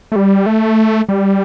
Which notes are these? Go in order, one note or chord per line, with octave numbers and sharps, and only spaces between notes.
A3
G3
A3
G3